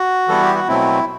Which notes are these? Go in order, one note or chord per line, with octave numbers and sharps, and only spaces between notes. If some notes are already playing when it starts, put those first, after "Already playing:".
Already playing: F#4
E3 G3 B3 E4 A4
G4
F#4
B2 F#3 A3 C4 E4